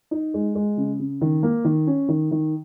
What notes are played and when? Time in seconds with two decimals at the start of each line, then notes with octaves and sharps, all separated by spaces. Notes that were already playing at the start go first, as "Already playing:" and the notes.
0.11 D#4
0.34 G#3
0.55 G#3
0.77 C#3
0.99 C#3
1.21 D#3
1.43 A#3
1.65 D#3
1.87 C#4
2.09 D#3
2.31 D#3